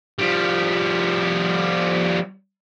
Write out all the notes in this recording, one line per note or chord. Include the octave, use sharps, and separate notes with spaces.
F3 G3